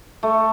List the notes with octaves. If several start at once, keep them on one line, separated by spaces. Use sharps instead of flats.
A3